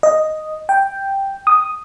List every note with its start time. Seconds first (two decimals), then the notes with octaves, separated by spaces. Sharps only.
0.03 D#5
0.69 G5
1.47 D#6